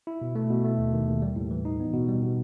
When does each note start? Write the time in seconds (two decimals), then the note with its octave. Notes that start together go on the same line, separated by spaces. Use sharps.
0.07 E4
0.22 B2
0.35 A3
0.50 B2
0.64 A3
0.78 D#2
0.93 D#3
1.08 D#2
1.22 G3
1.36 A2
1.51 E3
1.65 D#4
1.80 B3
1.94 B2
2.08 G3
2.22 B2